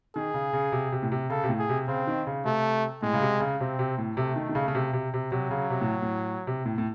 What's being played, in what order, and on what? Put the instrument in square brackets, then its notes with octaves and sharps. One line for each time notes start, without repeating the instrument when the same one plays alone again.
[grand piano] D#3 [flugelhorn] G#4
[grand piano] C#3
C#3
C3
C3
A2
C3
[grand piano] C#3 [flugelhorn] A4
[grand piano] C3
A2
[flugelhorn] G#4
[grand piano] C3
[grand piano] C#3 [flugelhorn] C4
[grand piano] D#3
C#3
[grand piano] C3 [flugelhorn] A3
[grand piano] A2 [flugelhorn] G#3
[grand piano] C#3
C3
C#3
[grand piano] C3 [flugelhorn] C4
[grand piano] C3
A2
[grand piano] C3 [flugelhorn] A3
[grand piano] D#3
D#3
C#3
C#3
C3
C3
C3
[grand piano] C3 [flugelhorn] F#3
[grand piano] C#3
C3
A2
A2
C3
A2
A2